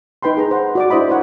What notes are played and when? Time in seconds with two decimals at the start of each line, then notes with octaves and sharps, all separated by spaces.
0.23 D#4 B4 G5 B5 C6
0.37 G#4 A#4 B4 A#5
0.51 C5 F#5
0.75 F#4 D5 D6
0.90 D4 E4 C5 D#5 B5
1.09 A#4 C5 C#5 F#5